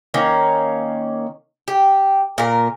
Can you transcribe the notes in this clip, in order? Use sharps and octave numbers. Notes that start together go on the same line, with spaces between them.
D#3 A#3 C#4
G4
A#2 A#4